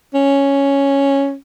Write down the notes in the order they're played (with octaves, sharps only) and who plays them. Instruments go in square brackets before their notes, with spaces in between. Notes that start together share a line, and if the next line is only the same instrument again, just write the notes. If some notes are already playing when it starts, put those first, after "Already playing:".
[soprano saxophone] C#4